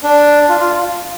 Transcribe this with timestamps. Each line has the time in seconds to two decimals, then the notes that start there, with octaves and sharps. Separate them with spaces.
0.03 D4
0.49 F4
0.60 F4